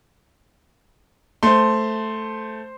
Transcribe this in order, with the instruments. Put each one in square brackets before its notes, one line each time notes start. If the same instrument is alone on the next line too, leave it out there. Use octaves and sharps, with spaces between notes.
[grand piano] A3 [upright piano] C5 C6